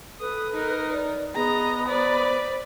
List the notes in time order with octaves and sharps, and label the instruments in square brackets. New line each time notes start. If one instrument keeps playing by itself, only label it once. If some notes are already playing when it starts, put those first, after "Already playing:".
[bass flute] A4 [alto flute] B4 [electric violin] D#6
[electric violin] D#4 A#4
[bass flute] D5
[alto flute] B3 [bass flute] G#4 [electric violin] D#5 A#5
[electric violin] B4 D5 [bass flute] C5